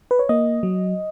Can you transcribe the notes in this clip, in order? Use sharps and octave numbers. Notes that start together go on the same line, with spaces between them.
B4
C#5
A#3 D#5
F#3